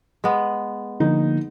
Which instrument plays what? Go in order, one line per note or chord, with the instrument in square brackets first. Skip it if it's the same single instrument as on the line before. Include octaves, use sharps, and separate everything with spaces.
[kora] G#3 B3
[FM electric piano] D3 F3 A#3 [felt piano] D#4